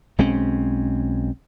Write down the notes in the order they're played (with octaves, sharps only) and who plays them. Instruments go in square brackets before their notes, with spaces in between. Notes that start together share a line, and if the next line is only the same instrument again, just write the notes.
[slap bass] B1 G#3 C4 C#4